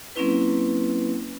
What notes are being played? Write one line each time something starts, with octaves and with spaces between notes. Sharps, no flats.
F#3 A#3 C4 C#4 E4 B4